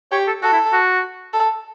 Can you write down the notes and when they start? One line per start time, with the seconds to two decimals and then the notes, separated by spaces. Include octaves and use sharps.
0.12 G4 C#5
0.27 A4
0.43 F#4 A4
0.53 E4
0.72 F#4
1.34 A4